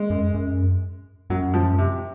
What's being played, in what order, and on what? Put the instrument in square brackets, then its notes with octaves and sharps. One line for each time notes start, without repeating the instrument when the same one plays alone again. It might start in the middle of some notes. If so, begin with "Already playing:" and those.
Already playing: [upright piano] G#3
[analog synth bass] F#2
F#2
[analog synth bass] F#2 [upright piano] F#3
[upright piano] F3
C3